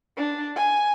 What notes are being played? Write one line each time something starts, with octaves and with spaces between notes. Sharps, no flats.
D4
G#5